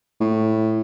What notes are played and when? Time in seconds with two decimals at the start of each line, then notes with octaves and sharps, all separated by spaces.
0.20 A2